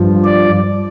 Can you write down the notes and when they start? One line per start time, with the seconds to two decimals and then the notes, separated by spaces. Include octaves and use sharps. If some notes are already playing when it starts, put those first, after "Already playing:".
Already playing: G2 F3
0.24 D5